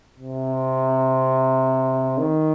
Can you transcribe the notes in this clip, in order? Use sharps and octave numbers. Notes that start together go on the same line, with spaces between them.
C3
D#3